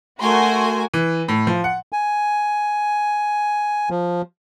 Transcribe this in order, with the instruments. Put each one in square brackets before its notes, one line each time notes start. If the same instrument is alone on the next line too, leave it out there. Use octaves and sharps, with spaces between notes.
[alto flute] A3 [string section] F#4 [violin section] A#4 G#5 [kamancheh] C6
[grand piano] E3
A2
F3
F#5
[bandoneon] G#5
F3